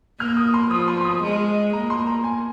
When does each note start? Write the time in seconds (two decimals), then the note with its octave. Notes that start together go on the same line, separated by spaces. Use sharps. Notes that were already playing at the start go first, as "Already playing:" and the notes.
0.20 A#3 F6
0.37 D#6
0.54 C6
0.71 F3 D#6
0.88 C6
1.01 C6
1.05 D#6
1.23 G#3
1.73 A#3 A#5
1.90 C6
2.07 A#5
2.24 G#5